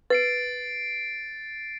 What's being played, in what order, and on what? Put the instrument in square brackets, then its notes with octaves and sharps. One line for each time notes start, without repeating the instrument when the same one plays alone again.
[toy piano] B4 [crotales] A6 C7 D7